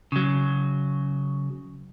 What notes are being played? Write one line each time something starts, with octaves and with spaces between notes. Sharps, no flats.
C#3 F#3